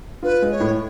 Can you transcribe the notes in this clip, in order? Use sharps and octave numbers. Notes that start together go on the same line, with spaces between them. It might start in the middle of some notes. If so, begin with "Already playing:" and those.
F4 B4
G#3
C#5
A2